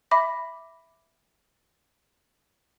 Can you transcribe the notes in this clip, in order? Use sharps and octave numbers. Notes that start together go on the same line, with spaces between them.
E5 B5 D6 A#6